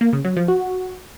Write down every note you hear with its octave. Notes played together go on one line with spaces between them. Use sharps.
A#3
C#3
F#3
F3
F#4